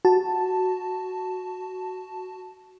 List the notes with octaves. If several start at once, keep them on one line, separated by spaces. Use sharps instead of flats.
F#4 A5